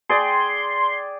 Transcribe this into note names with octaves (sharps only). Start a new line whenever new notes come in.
G#4 D5 G5 C6